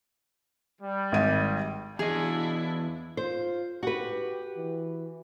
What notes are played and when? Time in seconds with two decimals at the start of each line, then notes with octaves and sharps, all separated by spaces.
0.82 G3
1.12 G#1 D#7
1.99 E2 D4 E4 G#4 D#5
3.17 F4 C5
3.83 F#4 G4 B4
4.57 E3